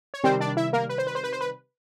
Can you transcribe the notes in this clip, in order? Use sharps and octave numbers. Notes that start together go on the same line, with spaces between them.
C#5
C3 D#3 G3 C4 C5
D4 D5
E4 E5
A#3 A#4
B4
C5
B4
C5
B4
C5
B4